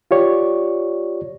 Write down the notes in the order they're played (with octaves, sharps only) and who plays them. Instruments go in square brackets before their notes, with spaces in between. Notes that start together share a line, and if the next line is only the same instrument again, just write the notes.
[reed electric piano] F4 G4 C#5 D5